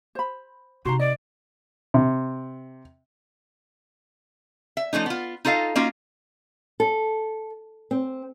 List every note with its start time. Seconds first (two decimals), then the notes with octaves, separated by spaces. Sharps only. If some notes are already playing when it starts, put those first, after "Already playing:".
0.15 C5 B5
0.85 C3 D#4 F#4 A#5 C6
0.99 D5 D#5
1.94 C3
4.77 E5
4.93 F3 A3 C#4 D#4
5.06 B3 F4
5.45 D#4 F4 A4 D#5 F5
5.76 A#3 C#4 D#4 F4 F#4
6.80 A4
7.91 C4